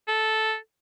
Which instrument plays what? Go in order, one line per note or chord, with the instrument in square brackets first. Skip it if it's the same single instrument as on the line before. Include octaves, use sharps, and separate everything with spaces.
[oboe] A4